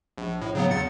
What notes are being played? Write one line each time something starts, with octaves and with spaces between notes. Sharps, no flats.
A#1
A2
C#3 F#3 B3
E2 A6 C#7